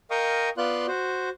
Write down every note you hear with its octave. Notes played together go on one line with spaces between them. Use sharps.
A#4 D#5 F5 G5 C#6 D#6
B3 F4 D5 F5 C6 F#6
F#4 C5